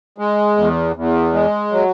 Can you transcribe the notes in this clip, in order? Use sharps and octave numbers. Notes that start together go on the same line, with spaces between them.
G#3
E2
E2
G#3
F#3